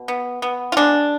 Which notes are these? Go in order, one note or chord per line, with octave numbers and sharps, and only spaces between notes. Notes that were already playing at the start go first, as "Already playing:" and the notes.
Already playing: B2
B3
B3
F4
G#3 D4